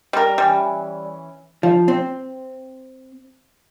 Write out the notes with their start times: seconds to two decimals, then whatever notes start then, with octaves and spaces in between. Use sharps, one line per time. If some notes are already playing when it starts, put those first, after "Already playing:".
0.13 G3 A#4
0.38 E3 G3 C#4
1.63 F3
1.88 C4